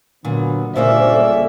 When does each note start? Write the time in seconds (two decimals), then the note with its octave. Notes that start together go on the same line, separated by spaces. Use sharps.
0.25 A#2 D3 F#3 B3
0.76 G1 A#2 C#3 A#3 C5 D5 E5
1.14 A4